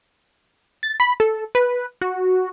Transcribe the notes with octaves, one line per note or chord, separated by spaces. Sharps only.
A6
B5
A4
B4
F#4